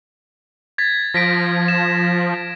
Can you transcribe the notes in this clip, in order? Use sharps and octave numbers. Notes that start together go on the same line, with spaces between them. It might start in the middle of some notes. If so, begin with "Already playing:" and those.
G#6 A6 B6
F3 A#6 B6 D7
E7